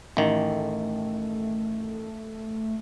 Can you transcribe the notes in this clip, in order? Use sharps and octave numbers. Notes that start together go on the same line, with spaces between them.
A1 D#3 A3